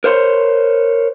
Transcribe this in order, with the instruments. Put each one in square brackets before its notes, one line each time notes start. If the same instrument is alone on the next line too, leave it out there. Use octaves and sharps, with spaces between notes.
[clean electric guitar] A#4 C5 C#5 C6